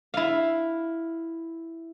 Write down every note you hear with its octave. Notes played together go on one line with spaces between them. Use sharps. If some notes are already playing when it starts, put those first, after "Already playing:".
E4 F5